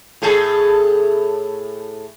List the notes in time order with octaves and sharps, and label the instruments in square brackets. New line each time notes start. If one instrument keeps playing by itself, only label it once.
[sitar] A2 G#4 A4